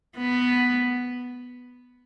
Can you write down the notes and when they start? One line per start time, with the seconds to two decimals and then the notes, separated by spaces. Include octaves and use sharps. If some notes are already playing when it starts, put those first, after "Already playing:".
0.17 B3